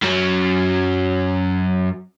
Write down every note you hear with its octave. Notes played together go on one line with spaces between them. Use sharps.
F#2 F#3